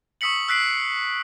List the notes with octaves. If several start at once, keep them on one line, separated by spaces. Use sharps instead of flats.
C#6 D#6 E6 B6 C#7 F#7
E6 F#6 B6 C7 D7 F#7